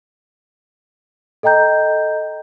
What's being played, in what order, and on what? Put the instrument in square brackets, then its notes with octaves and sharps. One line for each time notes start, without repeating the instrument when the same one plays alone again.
[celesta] A4 D#5 G5 A#5 G6